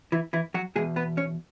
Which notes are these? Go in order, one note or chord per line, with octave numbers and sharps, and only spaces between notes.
E3 E4
E3 E4
F#3 F#4
E2 B2 G#3 G#4
B3 B4
C#4 C#5